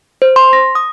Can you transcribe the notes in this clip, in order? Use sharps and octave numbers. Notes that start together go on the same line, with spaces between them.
C5
C6
A#6
D#6